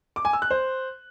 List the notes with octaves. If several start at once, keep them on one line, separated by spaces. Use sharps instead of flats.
D6
G#5
E6
F#6
C5